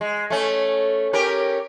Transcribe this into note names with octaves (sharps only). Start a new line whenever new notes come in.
G#3
A3 C#4
C#4 G4 A#4